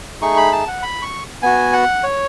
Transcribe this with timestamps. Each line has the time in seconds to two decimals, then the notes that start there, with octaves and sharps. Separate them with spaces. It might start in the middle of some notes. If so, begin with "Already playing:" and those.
0.21 A3 D#4 G#4 C#6
0.37 B5
0.52 A5
0.67 F#5
0.83 B5
1.02 C#6
1.42 B3 F#4 G#5
1.73 F#5
2.03 C#5